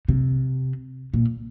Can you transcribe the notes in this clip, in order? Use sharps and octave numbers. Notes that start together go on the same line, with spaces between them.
C3
A#2